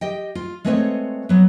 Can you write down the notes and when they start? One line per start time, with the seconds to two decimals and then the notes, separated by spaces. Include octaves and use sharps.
0.01 G4 D#5 G5
0.35 F4
0.65 G#3 A3 C4 B4 C#5 D#5
1.29 F#3 B3